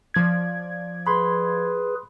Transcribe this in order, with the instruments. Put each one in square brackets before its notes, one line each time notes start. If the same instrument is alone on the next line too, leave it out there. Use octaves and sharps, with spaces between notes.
[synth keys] F3 D5 G#6
[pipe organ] G#4 B4 [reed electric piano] B5 C6